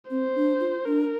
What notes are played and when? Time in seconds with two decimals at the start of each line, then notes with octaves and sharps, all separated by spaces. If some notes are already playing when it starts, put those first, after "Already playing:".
0.10 C4 C5
0.35 D4
0.60 F4
0.86 D4 A#4